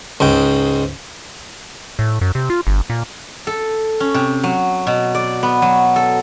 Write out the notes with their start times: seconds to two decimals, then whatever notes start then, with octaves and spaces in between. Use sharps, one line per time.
0.20 C#2 G#2 G5
1.99 A2
2.21 F#2
2.35 C3
2.50 F4
2.67 G1
2.90 A#2
3.47 A4
4.00 C#4
4.14 C3
4.44 F#3
4.87 B2
5.15 D5
5.43 B3
5.62 F#3
5.96 A4